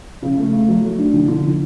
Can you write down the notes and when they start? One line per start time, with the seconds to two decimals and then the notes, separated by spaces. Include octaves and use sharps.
0.22 C#3
0.38 A3
0.53 A3
0.68 F#3
0.83 A3
0.98 D4
1.13 D3
1.28 D3
1.44 D3